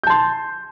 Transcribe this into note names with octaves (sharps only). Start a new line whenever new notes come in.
A5 C6 G6